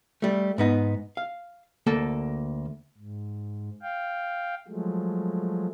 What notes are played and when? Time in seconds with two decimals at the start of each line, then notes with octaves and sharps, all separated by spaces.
0.22 G3 A3
0.58 G#2 B3 D#4
1.17 F5
1.87 D2 A#3 A4
2.98 G#2
3.82 F5 G5
4.68 F3 F#3 G#3 A3